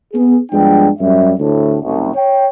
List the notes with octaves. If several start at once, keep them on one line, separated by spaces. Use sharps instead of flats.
B3 G#4
G2 F3 G#3 B3 D4 G5
F#2 G3 E5
D2 A2
F#1 C2
C#5 G5